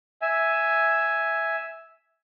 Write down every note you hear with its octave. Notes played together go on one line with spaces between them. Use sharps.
E5 G#5